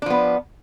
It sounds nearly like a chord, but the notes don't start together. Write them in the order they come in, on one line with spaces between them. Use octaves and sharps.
D4 F3 B3